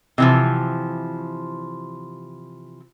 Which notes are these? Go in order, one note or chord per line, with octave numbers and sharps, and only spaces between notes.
C3 E3 F3